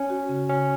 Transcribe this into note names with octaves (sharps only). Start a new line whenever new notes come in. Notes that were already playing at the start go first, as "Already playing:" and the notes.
Already playing: C#4
F#4
C#3
C#3 C#4